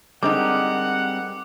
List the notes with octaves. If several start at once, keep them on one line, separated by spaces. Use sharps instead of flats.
D3 G3 G#3 C4 D#4 A#4 F#5 D6